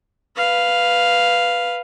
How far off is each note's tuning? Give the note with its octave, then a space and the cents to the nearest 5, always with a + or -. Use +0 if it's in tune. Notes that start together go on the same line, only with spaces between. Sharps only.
B4 +0 F5 +0